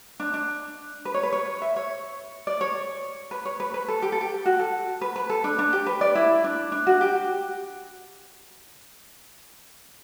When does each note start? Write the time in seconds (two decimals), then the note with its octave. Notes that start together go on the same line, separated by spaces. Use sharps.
0.20 D4
0.34 D4
1.05 B4
1.14 C#5
1.23 B4
1.33 C#5
1.62 E5
1.76 C#5
2.47 D5
2.61 C#5
3.31 B4
3.45 C#5
3.60 B4
3.74 B4
3.88 A4
4.02 G4
4.12 A4
4.21 G4
4.46 F#4
4.59 A4
5.01 B4
5.16 B4
5.30 A4
5.44 D4
5.59 D4
5.73 G4
5.86 B4
6.01 D5
6.15 E4
6.44 D4
6.72 D4
6.87 F#4
7.01 G4